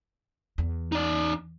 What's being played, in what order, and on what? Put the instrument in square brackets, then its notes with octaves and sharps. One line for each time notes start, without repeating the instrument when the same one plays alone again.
[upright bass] E2
[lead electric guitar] D#4 D5